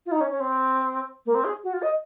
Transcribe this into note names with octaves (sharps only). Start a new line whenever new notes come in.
F4
D#4
C#4
C#4
C4
A#3
C4
G#4
F#4
F4
D#5